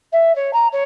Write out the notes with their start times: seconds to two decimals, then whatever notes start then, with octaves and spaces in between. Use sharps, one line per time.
0.12 E5
0.35 C#5
0.53 A#5
0.72 C#5